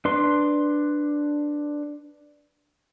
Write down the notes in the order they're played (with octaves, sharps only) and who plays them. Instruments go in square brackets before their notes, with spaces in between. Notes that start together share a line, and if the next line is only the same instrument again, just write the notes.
[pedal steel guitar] D4 B4 C6